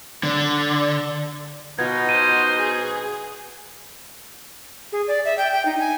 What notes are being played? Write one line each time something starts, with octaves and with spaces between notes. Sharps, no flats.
D3
B2 D#4 F4 G#6
C5 D#7
G#4
G#4
D5
E5
G5
G5
D#4
G#5